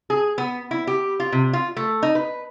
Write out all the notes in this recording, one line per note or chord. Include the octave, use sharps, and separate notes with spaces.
G#4
B3
E4
G4
F4
C3
F4
A3
D#4
B4